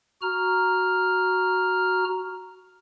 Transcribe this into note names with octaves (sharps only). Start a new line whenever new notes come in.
F#4 A#5 F6